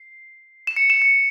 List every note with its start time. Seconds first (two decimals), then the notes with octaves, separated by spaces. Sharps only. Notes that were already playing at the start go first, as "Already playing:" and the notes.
Already playing: C7
0.67 E7
0.76 C#7
0.90 E7
1.02 C#7